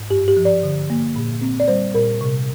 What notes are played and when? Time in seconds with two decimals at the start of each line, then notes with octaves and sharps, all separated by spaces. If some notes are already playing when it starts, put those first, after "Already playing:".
Already playing: G#2
0.10 G2 G4
0.28 G4
0.37 F3
0.45 D5
0.63 D3
0.90 A#3
1.16 A#2
1.41 C4
1.60 D5
1.68 G3 C5
1.95 A#2 A#4
2.21 C3